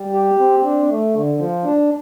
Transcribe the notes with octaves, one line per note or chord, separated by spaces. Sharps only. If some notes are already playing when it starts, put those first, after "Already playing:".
Already playing: G3
G4
C4
D4
A3
D3
F3
D4